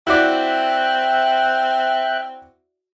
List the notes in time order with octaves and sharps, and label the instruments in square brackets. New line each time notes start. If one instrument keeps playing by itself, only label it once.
[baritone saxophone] C4 [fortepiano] E4 F#4 D5 [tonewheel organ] E5 G5 F#6